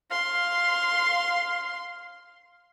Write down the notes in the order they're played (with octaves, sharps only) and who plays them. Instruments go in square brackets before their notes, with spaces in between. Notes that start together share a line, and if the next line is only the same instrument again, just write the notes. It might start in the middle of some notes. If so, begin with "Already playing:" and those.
[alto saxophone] F5 [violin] C6